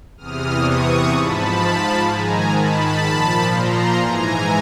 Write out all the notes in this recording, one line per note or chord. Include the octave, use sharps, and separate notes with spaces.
E2 C3 E3 D#6 F6
C#6 D#6
G#2 F3 A5 B5
G#2 D#3 G#5 A#5
A5 B5
A#2 F3
A#5 C6
G#2 E3 G#5 A#5